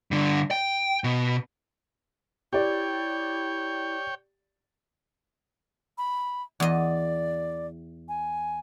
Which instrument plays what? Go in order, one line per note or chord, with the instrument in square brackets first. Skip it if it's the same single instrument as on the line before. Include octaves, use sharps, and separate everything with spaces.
[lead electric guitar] G2 D3
G5
B2
[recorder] E4 [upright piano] G4 D5 [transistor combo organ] C#5 G5
[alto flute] B5
[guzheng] E2 D#5 [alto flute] D5
[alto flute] G#5